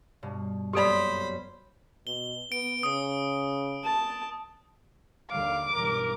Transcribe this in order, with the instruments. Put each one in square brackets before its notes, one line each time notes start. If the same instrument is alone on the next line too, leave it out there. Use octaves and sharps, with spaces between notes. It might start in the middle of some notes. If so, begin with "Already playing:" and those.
[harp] G2 B2
[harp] F#2 A#3 B3 [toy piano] G4 A4 D5 [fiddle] C5 B5
[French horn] B2 [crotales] G7
[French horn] B3 [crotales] D7
[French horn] C#3 [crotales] D#6 D7
[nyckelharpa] A5
[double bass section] D#2 D3 G3 [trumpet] F5 [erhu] D6
[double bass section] B1 E2 G2 [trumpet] A#4